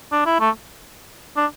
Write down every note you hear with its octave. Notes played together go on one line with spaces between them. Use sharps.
D4
E4
A3
D4